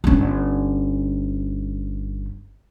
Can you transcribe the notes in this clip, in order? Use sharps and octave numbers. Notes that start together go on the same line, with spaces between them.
G1 C#4